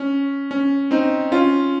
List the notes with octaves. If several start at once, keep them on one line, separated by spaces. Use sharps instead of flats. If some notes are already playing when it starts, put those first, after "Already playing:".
Already playing: C#4
C#4
C4 D#4
C#4 F4